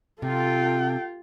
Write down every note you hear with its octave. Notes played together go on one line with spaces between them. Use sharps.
C3 F4 A4 G5